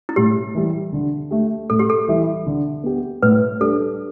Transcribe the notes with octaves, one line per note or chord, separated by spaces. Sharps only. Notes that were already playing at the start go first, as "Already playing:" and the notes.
E4
A2 G4
E3 G3
D3
A3 G4
A2 A4
G4
A4
E3 G3 E4
D3
B3 G4
A2 B4
G3 D4 G4 A4